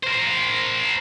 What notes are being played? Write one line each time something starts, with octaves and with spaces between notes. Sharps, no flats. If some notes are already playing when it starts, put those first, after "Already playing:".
A#4 C5